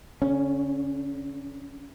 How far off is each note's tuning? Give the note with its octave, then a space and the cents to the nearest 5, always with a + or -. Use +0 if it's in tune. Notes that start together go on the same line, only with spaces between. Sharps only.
D3 -40 C#4 -5